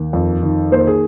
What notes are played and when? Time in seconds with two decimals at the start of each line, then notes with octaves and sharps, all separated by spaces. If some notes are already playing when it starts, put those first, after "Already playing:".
Already playing: D#2
0.13 F2
0.43 D#3
0.72 A#3 C5
0.87 G#4